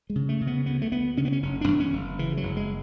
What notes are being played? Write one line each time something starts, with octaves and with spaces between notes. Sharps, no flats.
G#3
C#3
A3
C#3
B3
D2 B3
A3
D2 B3
C#3 C#4
B3
C#4
F#1 C#4
D4
E2
C#4
F#1
C#3 E3
F#3
F#1
G#3